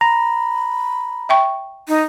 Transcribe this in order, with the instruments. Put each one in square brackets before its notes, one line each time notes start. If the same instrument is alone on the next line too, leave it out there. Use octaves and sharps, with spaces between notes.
[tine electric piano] A#5 [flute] B5
[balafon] E5 G5 C#6
[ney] D#4